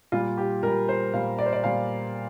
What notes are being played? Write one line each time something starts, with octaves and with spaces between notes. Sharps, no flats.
A#2 G3 F4
G4
A#2 G3 A#4
C5
A#2 G3 F5
D5
C5
D5
A#2 G3 F5